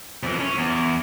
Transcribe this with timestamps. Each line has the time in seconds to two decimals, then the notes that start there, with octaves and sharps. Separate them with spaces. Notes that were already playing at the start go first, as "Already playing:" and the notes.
0.23 F2 E3
0.40 C#4
0.57 E2